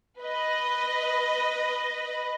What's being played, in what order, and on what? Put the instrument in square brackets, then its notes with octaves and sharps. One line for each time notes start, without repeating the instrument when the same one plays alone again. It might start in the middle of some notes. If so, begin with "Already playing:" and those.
[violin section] B4 D#5